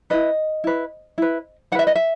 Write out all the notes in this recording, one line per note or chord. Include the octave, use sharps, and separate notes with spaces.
E4 B4 D#5
E4 B4
E4 B4
E4 B4 E5 F#5
D#5
E5